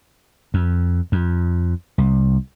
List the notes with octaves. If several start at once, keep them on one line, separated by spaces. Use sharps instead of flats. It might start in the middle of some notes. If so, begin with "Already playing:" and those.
F2
F2
C2